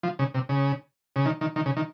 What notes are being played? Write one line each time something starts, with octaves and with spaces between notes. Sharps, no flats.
F3
C#3
C3
C#3
C#3
D#3
D#3
D#3
C#3
D#3